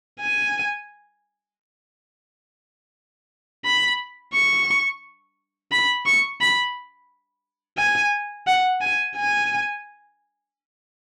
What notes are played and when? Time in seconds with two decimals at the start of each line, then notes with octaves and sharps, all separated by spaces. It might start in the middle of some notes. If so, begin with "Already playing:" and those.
0.21 G#5
3.65 B5
4.34 C#6
5.71 B5
6.06 C#6
6.41 B5
7.78 G#5
8.47 F#5
8.81 G#5
9.17 G#5